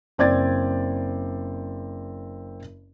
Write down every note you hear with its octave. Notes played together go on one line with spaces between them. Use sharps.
F#1 C4 D5 G#6 A6